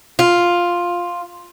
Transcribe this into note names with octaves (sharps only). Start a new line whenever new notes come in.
F4